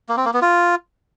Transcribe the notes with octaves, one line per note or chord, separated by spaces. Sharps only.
A#3
C4
A#3
B3
F4